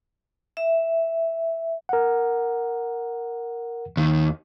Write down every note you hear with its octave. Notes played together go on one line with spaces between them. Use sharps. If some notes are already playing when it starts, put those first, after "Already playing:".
E5
A#4 F#5
D#2 D#3